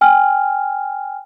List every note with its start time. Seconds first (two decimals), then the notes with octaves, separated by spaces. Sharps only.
0.01 G5 G#5 F6